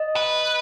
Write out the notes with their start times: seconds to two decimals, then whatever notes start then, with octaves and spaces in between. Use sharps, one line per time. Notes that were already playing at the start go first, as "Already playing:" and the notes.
Already playing: D#5
0.16 B4